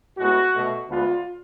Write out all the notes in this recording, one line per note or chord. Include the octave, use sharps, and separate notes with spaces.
A2 G#3 B3 F#4
B2 A3
D2 D3 G#3 B3 F4